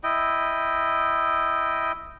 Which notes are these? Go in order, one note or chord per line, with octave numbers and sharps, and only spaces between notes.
E4 D#5 G5